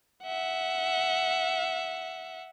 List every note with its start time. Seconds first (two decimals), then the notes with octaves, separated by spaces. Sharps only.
0.24 E5 F#5